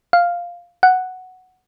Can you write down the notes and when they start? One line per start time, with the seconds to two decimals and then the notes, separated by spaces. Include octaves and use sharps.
0.13 F5
0.83 F#5